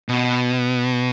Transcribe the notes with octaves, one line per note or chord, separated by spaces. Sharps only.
B2